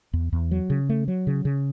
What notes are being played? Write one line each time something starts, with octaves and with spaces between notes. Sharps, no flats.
E2
E2
F#3
C#3
A3
F#3
C#3
C#3